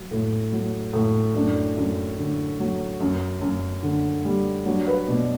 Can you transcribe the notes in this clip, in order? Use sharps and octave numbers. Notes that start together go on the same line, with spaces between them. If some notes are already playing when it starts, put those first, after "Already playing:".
Already playing: F#3
A2
F#3
A2
F#2 D4
F#2
D3
F#3
F#2
F#2
D3
G3
F#3 D4
B4
B2 D5